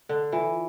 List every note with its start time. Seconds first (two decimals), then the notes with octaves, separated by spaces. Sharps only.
0.09 D3 A4
0.32 E3 F4